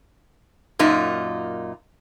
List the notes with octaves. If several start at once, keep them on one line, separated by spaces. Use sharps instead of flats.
F#2 A#2 D#4 F4